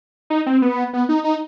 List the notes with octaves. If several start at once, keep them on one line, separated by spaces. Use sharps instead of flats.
D#4
C4
B3
B3
D#4
D#4